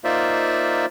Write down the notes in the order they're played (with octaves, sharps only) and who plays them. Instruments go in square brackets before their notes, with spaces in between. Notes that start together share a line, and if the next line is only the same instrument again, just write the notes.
[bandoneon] A#3 D#4 F4 C5 D5 E5